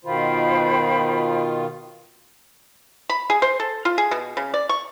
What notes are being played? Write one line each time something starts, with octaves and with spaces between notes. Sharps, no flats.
B2 D#3 F4 C5 G5 B5
B5
G#4
C5
A4
F4
G#4
B2
C#3
D5
C#6